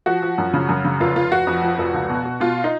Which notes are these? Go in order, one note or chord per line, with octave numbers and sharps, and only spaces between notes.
F3 F#4
F3
F#2
C#3
F#2
C#3
F1 F4
F1 F4
F1 F#4
F2
F3
F1
C#2
B2
B2
B2 F4
D#4